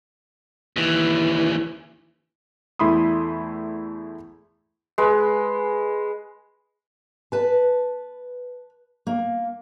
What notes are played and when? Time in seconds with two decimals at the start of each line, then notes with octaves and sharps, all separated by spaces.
0.76 D#2 E3
2.79 E2 A3 E4 B5 C6 D#6
4.98 G#3 B4
7.32 B4 A5
9.07 A#3